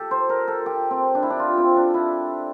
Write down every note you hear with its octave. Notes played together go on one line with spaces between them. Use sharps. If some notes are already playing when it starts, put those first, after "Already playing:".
Already playing: G4 A4
C5
A#4
A4
G4
C4
D4
E4
D4
F4
C4
D4
E4